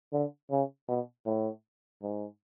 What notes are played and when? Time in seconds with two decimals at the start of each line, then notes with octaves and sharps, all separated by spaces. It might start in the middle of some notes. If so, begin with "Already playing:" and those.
0.13 D3
0.51 C#3
0.89 B2
1.26 A2
2.03 G#2